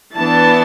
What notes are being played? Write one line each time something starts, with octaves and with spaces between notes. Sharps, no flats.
E3 B3 D4 A5